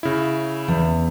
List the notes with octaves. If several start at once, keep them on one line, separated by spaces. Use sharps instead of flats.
C#3 E4
E2